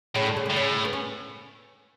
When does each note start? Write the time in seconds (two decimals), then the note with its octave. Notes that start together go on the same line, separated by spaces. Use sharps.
0.15 A2 C#3
0.26 D3
0.37 C#3
0.46 A2 D3
0.56 C#3
0.85 B3
0.93 C#4